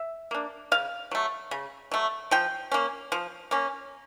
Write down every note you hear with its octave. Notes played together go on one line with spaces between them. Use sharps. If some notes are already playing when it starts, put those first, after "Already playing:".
Already playing: E5
A#3 D4
C#3 F5
F#3 A3
C#3
F#3 A3
F3 G5
A#3 C#4
F3
A#3 C#4